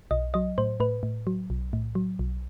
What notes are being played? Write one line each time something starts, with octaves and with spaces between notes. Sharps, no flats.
B1 D#5
F#3 D#5
A2 C5
A2 B4
A2
F#3
B1
A2
F#3
B1